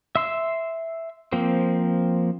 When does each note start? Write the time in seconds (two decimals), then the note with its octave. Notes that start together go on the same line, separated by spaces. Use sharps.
0.15 E5 C6 E6
1.32 F3 A#3 C4